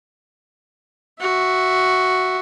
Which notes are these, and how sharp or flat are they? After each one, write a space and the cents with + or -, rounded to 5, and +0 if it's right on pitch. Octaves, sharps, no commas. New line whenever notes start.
F#4 +0 E5 +0